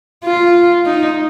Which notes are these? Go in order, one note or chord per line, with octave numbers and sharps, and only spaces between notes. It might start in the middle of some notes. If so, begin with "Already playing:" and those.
F4
D#4